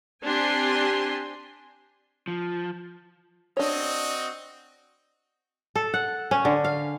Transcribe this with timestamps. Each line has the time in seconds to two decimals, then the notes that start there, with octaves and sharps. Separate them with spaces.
0.25 C4 D4 G4 G#5 C6
2.28 F3
3.57 C4 D4 F#4 C#5 D#5
5.76 A4
5.94 F#5
6.31 C#4
6.45 D3
6.64 F5